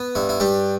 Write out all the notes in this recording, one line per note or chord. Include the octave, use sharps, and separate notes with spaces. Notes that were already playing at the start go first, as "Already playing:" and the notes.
Already playing: B3
G2 E4
E4
G2 D4 G4